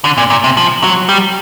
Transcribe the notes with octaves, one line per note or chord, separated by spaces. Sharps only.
D3
A#2
A#2
C3
F3
F#3
G3